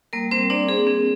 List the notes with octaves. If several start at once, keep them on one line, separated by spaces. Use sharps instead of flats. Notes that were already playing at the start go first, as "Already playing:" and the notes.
G3 A#3 A#4
G3 C4 C5
A#3 D4 D5
C4 G#4
C4